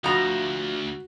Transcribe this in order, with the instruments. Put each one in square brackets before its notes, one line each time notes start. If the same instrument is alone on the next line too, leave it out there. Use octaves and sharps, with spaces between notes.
[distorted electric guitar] D2 [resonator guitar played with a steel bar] F3 A#5 [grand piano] F#4